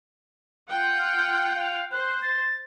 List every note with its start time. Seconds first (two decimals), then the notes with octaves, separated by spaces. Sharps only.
0.69 F4 F#5 G5
0.99 F6
1.56 F5
1.92 C5 F#6
2.22 A6